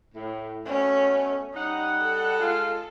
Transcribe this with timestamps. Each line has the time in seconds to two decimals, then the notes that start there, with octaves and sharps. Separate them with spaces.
0.15 A2
0.65 B2 A3 C#4
1.54 G3 D#4 D#5 F#5
2.02 A4
2.40 G#3 F4